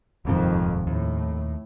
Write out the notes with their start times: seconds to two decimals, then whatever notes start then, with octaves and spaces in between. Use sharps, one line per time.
0.25 D#1 F2 G#2 C3 D#3
0.87 D#2 A2